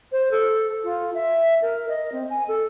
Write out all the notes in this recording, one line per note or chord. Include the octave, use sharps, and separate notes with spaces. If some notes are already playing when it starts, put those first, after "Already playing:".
C5
A4
F4
E5
A#4
D#5
C4
G#5
A4